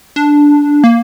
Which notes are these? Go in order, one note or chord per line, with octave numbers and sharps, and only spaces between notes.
D4
A#3